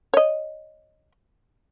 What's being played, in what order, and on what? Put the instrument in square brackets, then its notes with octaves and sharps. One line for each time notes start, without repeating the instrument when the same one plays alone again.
[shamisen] C#5 D#5